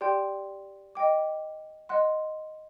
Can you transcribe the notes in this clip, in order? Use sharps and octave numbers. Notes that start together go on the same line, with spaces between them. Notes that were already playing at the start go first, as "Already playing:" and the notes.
G4 D5 G5 C6 G6
D#5 G5 D6
D#5 F#5 C6 F#6